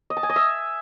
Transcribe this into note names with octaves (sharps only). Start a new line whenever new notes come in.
D#5
A5
G#5
D#5
E5